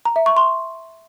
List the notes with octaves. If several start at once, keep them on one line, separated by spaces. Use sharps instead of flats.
A#5
E5
C#6
C6